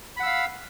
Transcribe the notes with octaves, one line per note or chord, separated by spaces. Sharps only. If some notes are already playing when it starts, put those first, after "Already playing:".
F5 F#5 B5 E6